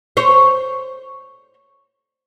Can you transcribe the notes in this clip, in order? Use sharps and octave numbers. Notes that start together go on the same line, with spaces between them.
C5 C#5